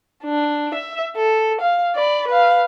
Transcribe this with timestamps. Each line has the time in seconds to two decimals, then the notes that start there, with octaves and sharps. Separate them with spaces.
0.24 D4
0.75 E5
1.17 A4
1.61 F5
1.96 D5 B5
2.28 B4 F5